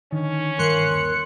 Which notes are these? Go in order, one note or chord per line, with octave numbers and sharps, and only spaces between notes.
D3 D#3 C#4
G2 D#3 A#4 F5 C6 F#6 C#7
D#2